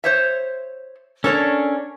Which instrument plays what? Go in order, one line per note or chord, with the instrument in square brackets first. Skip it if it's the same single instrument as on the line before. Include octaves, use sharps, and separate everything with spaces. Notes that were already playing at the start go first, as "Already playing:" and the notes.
[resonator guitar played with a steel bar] C5 C#5 E5
[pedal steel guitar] C#4 D4 [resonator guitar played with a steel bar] A4 A#4 C#5